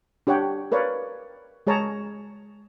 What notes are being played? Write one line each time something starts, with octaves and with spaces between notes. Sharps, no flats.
D4 G4 C#5 F#5 G5
A#4 B4 C#5 D5 F5
G#3 G#4 C#5 A5 A#5